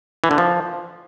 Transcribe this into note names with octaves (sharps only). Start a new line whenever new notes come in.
E3
D3
F3